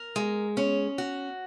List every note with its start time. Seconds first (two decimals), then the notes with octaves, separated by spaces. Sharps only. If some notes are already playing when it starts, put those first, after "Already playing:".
Already playing: A#4
0.16 G#3
0.57 C#4
0.98 F#4